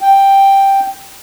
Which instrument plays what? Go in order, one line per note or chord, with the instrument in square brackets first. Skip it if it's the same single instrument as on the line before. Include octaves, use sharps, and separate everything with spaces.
[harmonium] G5